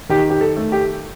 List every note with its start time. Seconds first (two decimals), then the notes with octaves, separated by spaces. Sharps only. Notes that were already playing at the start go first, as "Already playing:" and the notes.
0.09 D#3 G4
0.30 G4
0.41 A4
0.56 A3
0.72 G4